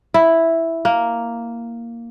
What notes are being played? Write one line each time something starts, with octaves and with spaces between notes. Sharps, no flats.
E4
A#3